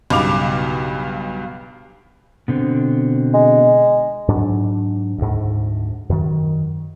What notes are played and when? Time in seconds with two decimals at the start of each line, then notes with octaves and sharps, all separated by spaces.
0.10 B1 G2 C#3 D6 F7
2.48 B2 D3 C4
3.34 G#3
4.28 G#2 F#3 D4
5.18 D2 G#2
6.09 F#2 D#3